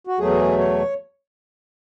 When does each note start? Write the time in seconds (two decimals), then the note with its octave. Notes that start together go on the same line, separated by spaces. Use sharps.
0.07 F#4
0.19 E2 B2 F#3 A3 G#4
0.59 C#5